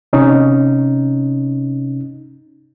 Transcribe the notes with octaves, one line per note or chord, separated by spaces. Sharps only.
C3 C#4 D#4